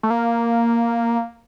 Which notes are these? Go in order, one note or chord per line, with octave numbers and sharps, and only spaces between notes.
A3
A#3